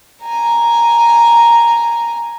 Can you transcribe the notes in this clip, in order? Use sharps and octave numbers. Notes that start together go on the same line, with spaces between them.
G#5 A#5